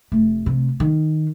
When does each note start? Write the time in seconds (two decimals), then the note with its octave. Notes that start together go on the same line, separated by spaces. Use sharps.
0.12 F1 A3
0.46 C3
0.80 D#3